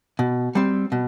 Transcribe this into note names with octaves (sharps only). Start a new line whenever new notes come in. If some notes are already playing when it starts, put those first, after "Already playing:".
B2
G3 C4
B2